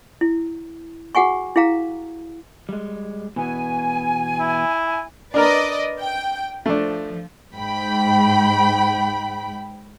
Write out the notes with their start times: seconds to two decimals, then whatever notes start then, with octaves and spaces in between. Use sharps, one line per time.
0.21 E4
1.15 F#4 G#4 F#5 G#5 C#6
1.56 E4 G#4 F5 A#5
2.69 G3 G#3
3.36 B2 E3 B3 G#5
4.40 E4
5.34 D4 A#4 B4 D5 D#5 A#5
6.00 G5
6.66 F3 A3 D4
7.56 G#2 G5 B5